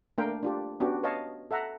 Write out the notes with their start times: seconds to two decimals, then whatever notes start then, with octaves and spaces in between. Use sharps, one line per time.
0.18 A3 A#3 D4 A#4 F5 G5
0.43 D4 F4 G4
0.80 B3 C#4 D4 F#4 G4
1.03 B4 C#5 D#5 F5 A5
1.51 A4 E5 F#5 A#5